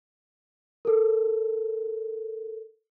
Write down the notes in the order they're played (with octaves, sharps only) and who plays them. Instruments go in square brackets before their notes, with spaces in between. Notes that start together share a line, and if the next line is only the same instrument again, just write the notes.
[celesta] A4 A#4